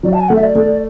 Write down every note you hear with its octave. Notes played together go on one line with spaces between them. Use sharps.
F#3 D5
A5
G#5
A3 F#5
E5
D5
A3